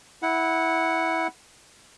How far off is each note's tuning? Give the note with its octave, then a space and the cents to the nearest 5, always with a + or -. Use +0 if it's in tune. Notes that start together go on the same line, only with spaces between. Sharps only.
E4 -10 F#5 +0